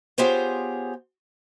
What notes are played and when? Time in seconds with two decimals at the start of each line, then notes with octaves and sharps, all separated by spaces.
0.18 B3 F4 G4 G#4 C5 C#5